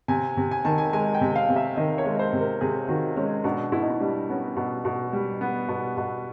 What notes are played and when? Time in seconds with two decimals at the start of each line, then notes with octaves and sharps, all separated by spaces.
0.08 C3 G#5
0.37 C3
0.51 G#5
0.65 D#3 A5
0.78 G#5
0.93 G#3 G#5
1.14 G5
1.21 C3
1.35 F5
1.49 C3
1.56 E5
1.76 D#3 D#5
1.98 C#5
2.05 G#3
2.19 C5
2.33 C3
2.40 A#4
2.61 C3 G#4
2.88 D#3 F#4
3.16 G#3 C#4
3.44 B2 D4
3.72 B2 E4
3.82 D#4
3.90 E4
4.00 G3 D4
4.29 B3 C#4
4.57 B2
4.85 B2
5.13 G3
5.41 B3
5.69 B2
5.97 B2